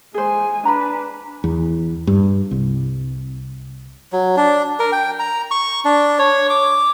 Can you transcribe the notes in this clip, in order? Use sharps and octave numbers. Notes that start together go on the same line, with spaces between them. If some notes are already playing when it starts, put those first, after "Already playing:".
G#3 G#4 C5 G#5
D4 B4 A#5 B5
E2
G2
C2
F#3
D4
A#4
G5
A#5
C#6
D4
C#5
D6